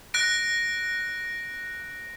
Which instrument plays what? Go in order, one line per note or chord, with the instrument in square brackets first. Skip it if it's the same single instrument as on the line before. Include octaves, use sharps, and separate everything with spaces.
[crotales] F#6 A#6 D7